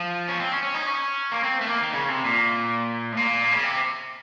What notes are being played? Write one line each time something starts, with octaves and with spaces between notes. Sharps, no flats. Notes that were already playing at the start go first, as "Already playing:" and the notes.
Already playing: F3
C#4
C4
C#4
C#4
D#4
C#4
A#3
C4
A3
A#3
D#3
C#3
C3
A#2
A2
A#2
C#3
C3